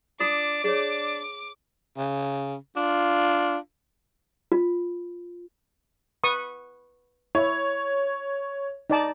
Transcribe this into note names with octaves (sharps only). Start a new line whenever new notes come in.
D4 F4 D6 D#6
D4 G#4 C#5
C#3
D4 F4
F4
B4 C#6 D#6
E4 C#5
D#4 D5 A5